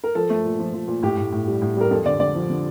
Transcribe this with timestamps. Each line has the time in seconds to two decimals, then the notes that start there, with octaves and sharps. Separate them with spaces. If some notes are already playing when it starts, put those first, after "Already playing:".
0.04 A#4
0.15 F3 A4
0.30 A3
0.45 A#2
0.59 F3
0.73 F3
0.88 A#2
1.03 A2 G4
1.17 A2
1.32 A2
1.47 G3
1.62 A2
1.77 G3 A#4
1.91 F2 A4
2.06 D3 D5
2.20 D3 D5
2.35 F3
2.50 D3